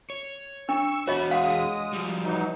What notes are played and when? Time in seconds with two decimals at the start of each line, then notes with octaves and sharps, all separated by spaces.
0.10 C#5
0.69 D4 C#6 E6
1.08 E2 F#4 C#5 D#5 B5
1.31 G#3 F5 F#5 D#6
1.93 F3 G3
2.24 E3 F#3 D#4